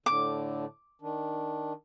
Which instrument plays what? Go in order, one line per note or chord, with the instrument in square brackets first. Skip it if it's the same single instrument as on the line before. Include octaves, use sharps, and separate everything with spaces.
[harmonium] A2 D3 [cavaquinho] D6
[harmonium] D#3 D4